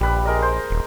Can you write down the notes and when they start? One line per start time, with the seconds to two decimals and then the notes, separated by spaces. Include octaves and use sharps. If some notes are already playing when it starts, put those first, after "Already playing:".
0.01 A#1 G3 B4
0.26 G#3 A#4 D#5
0.42 C5
0.70 D#1